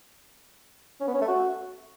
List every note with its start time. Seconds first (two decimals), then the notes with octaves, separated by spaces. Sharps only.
1.00 C#4
1.07 B3
1.14 C#4
1.21 A3
1.28 F#4